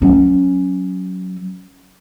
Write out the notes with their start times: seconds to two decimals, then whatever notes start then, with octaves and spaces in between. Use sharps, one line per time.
0.02 F#3 C#4